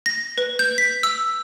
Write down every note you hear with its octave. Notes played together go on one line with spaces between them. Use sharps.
A#6
B4
G6
B6
E6